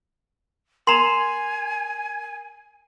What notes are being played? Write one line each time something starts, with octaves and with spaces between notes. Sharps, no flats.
A#4 G#5 A#5 C6 C7 F7